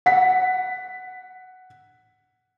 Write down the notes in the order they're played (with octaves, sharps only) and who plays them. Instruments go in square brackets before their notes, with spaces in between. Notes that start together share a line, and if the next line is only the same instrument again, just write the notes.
[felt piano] F#5 B6